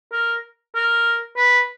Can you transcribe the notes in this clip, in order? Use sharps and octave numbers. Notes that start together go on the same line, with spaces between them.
A#4
A#4
B4